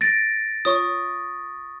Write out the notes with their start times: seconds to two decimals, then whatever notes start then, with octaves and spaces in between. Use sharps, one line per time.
0.01 A6 A#6 D7
0.65 F4 C#5 C#6 D#6